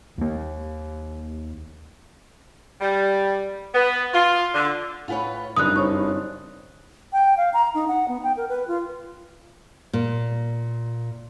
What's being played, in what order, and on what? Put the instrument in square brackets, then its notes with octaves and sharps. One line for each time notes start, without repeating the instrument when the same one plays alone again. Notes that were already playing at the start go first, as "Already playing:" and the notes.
[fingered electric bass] D#2 A#3
[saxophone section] G3
B3
F4
D3
[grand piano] A2 [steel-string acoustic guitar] F4 B4 C#5 [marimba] F#5 G#5 B5
[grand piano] F#1 G2 [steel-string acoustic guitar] C4 D#4 [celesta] D#6 F#6
[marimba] C5 C#5 C#6
[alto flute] G5
F5
A#5
D#4
F#5
B3
G5
A#4
B4
F4
[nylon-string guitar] A#2